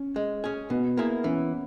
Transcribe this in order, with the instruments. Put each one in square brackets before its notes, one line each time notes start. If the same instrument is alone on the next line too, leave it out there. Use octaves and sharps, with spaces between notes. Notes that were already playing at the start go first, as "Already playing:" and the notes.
Already playing: [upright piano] C#4
[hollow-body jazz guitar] G#3
C#4 G#4
[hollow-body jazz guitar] B2 [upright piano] B3
[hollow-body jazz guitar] A#3 E4 G#4
[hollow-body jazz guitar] E3 [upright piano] C#4